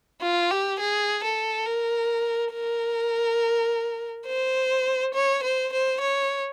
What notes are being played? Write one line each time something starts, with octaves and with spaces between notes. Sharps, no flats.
F4
G4
G#4
A4
A#4
A#4
C5
C#5
C5
C5
C#5